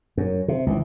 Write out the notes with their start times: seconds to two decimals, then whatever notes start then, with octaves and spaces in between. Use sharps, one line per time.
0.17 F#2
0.48 C3
0.67 C#2 E3